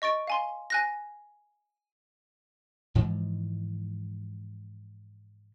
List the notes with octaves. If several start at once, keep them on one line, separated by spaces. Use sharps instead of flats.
D#5 C#6 A6 D7
F5 G#5 C6
G#5 F#6 A#6
G#2 E3 F3 G#3